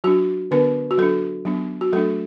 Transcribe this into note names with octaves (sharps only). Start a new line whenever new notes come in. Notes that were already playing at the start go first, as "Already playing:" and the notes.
F#3 D4 F#4
D3 B3 D4 B4
F#4
F#3 D4 A4
F#3 B3 D4
F#4
F#3 A3 D4 A4